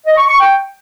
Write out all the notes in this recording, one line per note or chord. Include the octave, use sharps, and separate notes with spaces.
D#5
C#6
C#6
G5